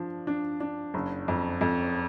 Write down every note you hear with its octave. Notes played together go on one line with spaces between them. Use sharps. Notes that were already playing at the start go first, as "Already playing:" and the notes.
Already playing: F3 D4
D4
D4
F#1
F2
F2